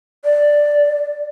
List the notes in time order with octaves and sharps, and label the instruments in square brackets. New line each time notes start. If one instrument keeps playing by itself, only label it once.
[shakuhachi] D5